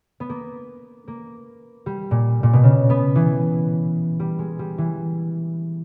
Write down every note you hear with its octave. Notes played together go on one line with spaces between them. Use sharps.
B3
A#3
A#3
G3
A#2
A#2
B2
C#3
B3
E3
G3
G#3
G3
E3